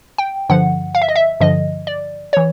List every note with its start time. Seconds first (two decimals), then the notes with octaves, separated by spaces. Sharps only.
0.18 G5
0.49 G2 D3 F3 F#5
0.95 F5
1.02 E5
1.09 D#5
1.16 E5
1.41 G2 D3 F3 D#5
1.87 D5
2.33 E3 C#5